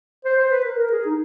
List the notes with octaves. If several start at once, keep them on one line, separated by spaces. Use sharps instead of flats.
C5
C5
B4
A#4
A#4
G#4
D#4